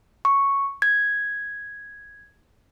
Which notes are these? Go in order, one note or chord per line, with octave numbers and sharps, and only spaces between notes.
C#6
G#6